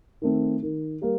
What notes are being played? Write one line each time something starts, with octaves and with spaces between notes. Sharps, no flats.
D#3 A3 C4
D#3
G3 A#3